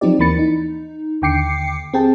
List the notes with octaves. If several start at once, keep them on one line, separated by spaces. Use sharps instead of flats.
F3 F#3 C4 D#4 G4 D5
D#2 E3 A#3 B5 A6 C#7
D#4
D#2 D3 G5 D6 C7 C#7
C4 G4 G#4 G5 A5